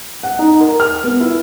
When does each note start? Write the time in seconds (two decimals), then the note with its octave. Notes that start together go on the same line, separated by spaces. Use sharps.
0.23 F#5
0.39 D#4
0.61 A#4
0.80 F6
1.04 B3
1.20 E4